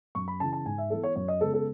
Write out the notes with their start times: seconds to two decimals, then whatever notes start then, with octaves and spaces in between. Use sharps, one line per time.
0.15 F#2 C#6
0.28 B5
0.40 C#3 E3 A5
0.53 A5
0.66 G#2 G#5
0.78 E5
0.90 E3 B3 A4
1.03 C#5
1.16 F#2 C#5
1.28 D#5
1.41 C#3 G#3 B3 A4
1.54 A4